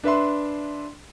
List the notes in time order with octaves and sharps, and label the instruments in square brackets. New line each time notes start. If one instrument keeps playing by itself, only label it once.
[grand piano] D4 B4 E5 C6